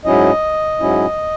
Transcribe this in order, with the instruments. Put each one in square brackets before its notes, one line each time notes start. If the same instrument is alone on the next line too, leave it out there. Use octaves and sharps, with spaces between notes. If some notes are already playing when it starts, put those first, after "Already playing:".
[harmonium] G#2 F#3 C#4 E4 D#5
G#2 F#3 C#4 E4